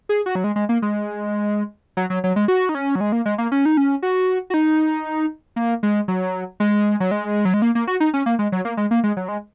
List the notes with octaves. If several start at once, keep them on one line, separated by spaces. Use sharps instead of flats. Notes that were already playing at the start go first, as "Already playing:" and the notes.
G#4
F#4
F#3
G#3
G#3
A#3
G#3
F#3
F#3
F#3
G#3
F#4
D#4
C#4
F#3
G#3
A#3
G#3
A#3
C#4
D#4
C#4
F#4
F#4
D#4
A#3
G#3
F#3
G#3
F#3
G#3
F#3
G#3
A#3
A#3
F#4
D#4
C#4
A#3
G#3
F#3
A#3
G#3
A#3
G#3
F#3
G#3